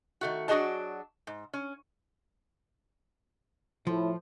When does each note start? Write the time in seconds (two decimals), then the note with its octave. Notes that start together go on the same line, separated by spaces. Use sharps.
0.21 D#3 A3 F#4
0.48 F#3 D4 F#4 G#4 D#5 A5
1.27 G#2
1.53 C#4
3.87 A2 F3 E4